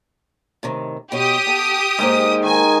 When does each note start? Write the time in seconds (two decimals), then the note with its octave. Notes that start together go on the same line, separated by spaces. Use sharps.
0.63 A2 C3 D#3
1.12 B2 G4 C#5 D#6
1.47 B3 A4
1.99 G#2 G#3 A#3 C5
2.43 D#3 G#5